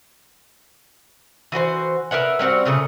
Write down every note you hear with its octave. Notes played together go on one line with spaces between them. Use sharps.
E3 F#4 B4 C5
A#4 B4 E5 F#5
G3 C4 F#4 F#5
A#2 C#3 A3 G#4